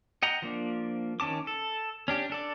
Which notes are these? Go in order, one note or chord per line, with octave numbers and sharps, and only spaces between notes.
D#5 F#5 G5 A#5
F3 A#3 D4
D#3 C#4 A5 D6
A4
C#4 D4 G4
D4 A4 D5